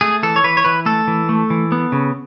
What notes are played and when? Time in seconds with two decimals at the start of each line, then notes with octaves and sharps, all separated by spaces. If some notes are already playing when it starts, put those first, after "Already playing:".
0.01 A3 G#4
0.23 E3 A4
0.36 C#5
0.44 E3 B4
0.57 C#5
0.64 E3 B4
0.86 A3 A4
1.08 E3
1.29 A3
1.50 E3
1.72 B3
1.92 C#3